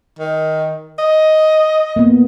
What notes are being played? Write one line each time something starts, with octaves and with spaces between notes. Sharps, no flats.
D#3
D#5
A#3 B3